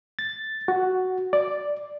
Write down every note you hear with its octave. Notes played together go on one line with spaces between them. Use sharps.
A6
F#4
D5